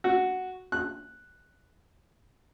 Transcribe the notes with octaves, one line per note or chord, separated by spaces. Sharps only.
F#4
F#6